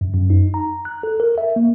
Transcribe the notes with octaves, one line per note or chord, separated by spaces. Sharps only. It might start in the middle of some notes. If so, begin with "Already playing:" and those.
F#2
F#2
D#4
A#5
F#6
A4
A#4
E5
A#3